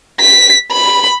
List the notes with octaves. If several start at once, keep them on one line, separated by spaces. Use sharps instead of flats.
B6
B5